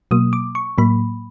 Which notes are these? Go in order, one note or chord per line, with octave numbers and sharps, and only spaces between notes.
B2 F#3 A#3 D#6
D6
C#6
A2 F#3 A#3 B5